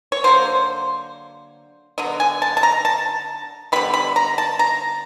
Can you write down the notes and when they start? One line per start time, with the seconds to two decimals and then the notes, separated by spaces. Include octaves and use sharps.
0.12 C#5
0.24 D3 F#3 A#3 C5
1.98 D3 F#3 B3 D#5
2.20 G#5
2.42 A5
2.57 A5
2.63 A#5
2.85 A5
3.72 D3 G3 B3 B5
3.94 B5
4.16 A#5
4.38 A5
4.59 A#5